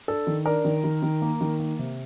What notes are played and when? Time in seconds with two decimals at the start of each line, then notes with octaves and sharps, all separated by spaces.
0.08 D4 A4
0.27 D#3
0.46 D4 A#4
0.65 D#3
0.84 D#3
1.03 D#3
1.22 A#3
1.41 D#3
1.60 A#3
1.79 C3